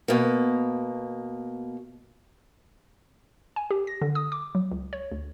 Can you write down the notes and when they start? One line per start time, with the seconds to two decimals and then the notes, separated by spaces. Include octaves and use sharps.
0.08 B2 A#3
3.56 G#5
3.71 G4
3.87 A#6
4.01 D3
4.15 D#6
4.32 D6
4.55 F#3
4.71 C#2
4.93 C#5
5.12 D2